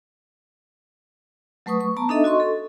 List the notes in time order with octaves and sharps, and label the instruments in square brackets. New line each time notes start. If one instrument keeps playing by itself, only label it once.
[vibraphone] F#3 A3 B4 C#6 D#6
C#6
B3 A5 A#5
D4 D#4 A4 D#5 E5
F#4 D#5 C6 C#6
A4